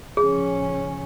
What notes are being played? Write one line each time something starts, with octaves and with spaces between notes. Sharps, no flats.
C#3 F3 C#4 G#4